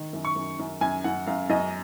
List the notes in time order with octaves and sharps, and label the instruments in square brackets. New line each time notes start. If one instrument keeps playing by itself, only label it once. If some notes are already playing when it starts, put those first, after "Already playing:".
Already playing: [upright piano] D#3
F#2
[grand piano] C#6
[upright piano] F#2
F#2
[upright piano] F#2 [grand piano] G#5
[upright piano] F#2 [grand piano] F#5
[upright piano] F#2 [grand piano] F5
[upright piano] F#2 [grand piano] D#5